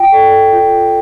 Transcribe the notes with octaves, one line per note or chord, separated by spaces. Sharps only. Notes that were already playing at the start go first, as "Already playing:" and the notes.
Already playing: F4 G5
A4 D5
F4